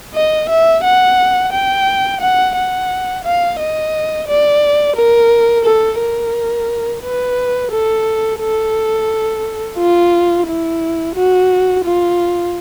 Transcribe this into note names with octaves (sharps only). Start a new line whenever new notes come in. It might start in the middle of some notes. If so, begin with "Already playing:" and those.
D#5
E5
F#5
G5
F#5
F#5
F5
D#5
D5
A#4
A4
A#4
B4
A4
A4
F4
E4
F#4
F4